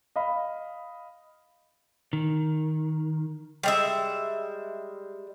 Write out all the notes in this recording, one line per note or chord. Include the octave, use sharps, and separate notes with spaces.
D#5 F5 B5
D#3
G3 G#3 E5